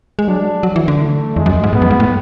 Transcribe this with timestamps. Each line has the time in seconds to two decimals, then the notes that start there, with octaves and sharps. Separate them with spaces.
0.19 G#3
0.28 F#3 D4
0.63 F#3
0.76 E3
0.88 D3
1.00 A3
1.36 E2 G#3
1.46 F#2
1.64 G#2
1.73 A2 B3
1.82 F#2
1.91 G#2
2.00 A2